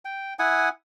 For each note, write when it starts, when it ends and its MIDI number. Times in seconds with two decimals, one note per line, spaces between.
0.05 0.34 79
0.39 0.69 64
0.39 0.69 78
0.39 0.69 80
0.39 0.69 87